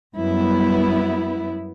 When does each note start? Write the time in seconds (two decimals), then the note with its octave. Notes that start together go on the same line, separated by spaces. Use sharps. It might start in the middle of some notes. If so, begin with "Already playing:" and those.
0.14 F#2 G3 B3 E4